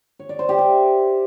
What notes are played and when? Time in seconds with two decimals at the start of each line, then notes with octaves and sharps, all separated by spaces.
0.19 C#5
0.29 D5
0.39 C5
0.49 G4
0.59 E5